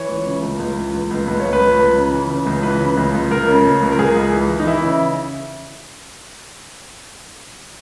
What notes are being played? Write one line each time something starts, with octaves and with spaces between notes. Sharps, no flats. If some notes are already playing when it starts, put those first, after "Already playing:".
Already playing: E3 C#5
C#2
C#3
C#2
C#2
E3
C#2
C#2
C#2 B4
C#5
C#2
B4
C#2
C#2
C#3
E3
C#3
C#2
E3 B4
C#3
C#2
C#2
C#2 A#4
C#3
C#2
C#2
A#4
C#2 G#4
C#2
E3
E3
D#4
E3 E4
C#3